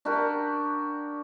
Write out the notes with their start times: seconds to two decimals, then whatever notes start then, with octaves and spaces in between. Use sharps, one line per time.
0.05 D4 F#4 G4 A#4